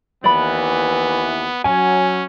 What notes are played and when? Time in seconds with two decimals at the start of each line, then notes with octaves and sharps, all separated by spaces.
0.24 D#2 E3 B3 D5 B5
1.64 F#3 C#4 G#5